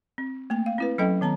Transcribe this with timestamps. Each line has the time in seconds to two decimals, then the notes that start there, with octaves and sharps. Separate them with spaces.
0.18 C4
0.50 A3 A#3 G5
0.66 F5
0.78 C4 E4 B4
0.98 F#3 C#4 A4 D#5 G5
1.21 D#3 B3 A5 A#5